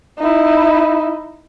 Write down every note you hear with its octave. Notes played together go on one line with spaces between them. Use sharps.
D#4 E4